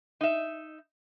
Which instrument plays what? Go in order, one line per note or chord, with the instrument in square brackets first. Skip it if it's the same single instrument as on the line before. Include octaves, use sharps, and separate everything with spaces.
[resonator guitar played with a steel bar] D#4 E5